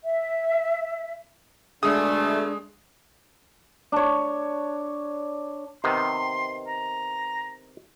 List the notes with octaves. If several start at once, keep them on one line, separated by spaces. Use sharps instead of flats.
E5
B2 D3 G#3 A3 D4 G#4 D#6
D4 C#5
C3 D#3 B3 C6
A#5